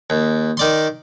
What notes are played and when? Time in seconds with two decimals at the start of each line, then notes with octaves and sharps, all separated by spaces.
0.10 D#2
0.57 D#3 D5 C6